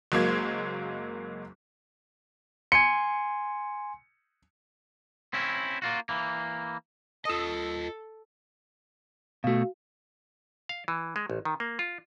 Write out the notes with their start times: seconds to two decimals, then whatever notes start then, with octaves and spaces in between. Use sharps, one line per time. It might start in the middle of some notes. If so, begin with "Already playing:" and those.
0.12 F#1 F#3 G#3 A#3 G#6
2.72 G#5 C6 C#7
5.33 C4 C#4 E4
5.82 A#3 F4 F#4
6.09 E3 A#3
7.25 F4 A4 D#5 D#6 E6
9.44 B2 A3 F#4 F5
10.69 F5
10.88 E3
11.16 G#3
11.30 A1
11.45 D#3
11.60 A#3
11.79 F4